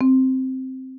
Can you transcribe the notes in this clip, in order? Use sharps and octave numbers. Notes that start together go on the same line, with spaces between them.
C4